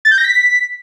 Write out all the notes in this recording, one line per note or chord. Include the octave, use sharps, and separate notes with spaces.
A6
G6
A#6
B6